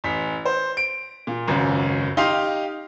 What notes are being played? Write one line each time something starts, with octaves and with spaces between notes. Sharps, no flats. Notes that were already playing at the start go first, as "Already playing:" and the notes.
A1 B6
C5
D7
A#2
G#1 C#2 F#2
D#4 G4 F5 C6